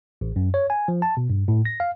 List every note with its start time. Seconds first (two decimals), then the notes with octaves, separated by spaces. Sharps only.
0.21 A1
0.36 F#2
0.54 C#5
0.70 G#5
0.88 F3
1.02 A5
1.17 B2
1.30 G2
1.48 A2
1.65 A#6
1.80 F5